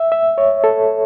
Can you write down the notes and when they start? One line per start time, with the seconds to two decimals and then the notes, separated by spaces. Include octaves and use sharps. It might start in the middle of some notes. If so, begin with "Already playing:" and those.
Already playing: E5
0.12 E5
0.38 C#5
0.64 A4